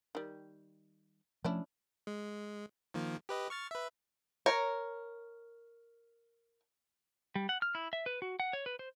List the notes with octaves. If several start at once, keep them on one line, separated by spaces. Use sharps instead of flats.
D#3 G3
F3 A3 C#4 D4 E4
G#3
D#3 F3 A#3
G4 B4 D#5
C#6 F6 A6
B4 E5
A#4 C#5
G3
F#5
F6
E4
E5
B4
F#4
F#5
C#5
B4
C5